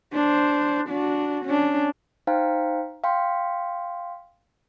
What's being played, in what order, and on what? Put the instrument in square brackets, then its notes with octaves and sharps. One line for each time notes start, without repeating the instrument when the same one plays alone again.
[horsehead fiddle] D4 C5
D4 F#4
C#4 D4
[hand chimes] D#4 C5 F5 G5 A#5
F5 G5 C6